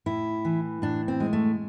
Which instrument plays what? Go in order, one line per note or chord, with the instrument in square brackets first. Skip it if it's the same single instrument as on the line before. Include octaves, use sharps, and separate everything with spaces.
[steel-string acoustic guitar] A2 E4
E3
A2 D4
C4
G#3
A3